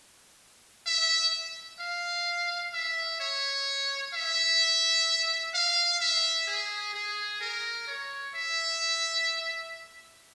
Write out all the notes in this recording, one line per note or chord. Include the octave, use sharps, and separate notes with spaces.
E5
F5
E5
C#5
E5
F5
E5
G#4
G#4
A#4
C#5
E5